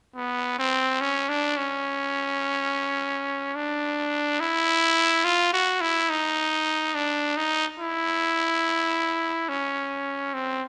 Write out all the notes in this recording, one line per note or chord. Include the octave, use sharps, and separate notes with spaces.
B3
C4
C#4
D4
C#4
D4
E4
F4
F#4
E4
D#4
D4
D#4
E4
C#4
C4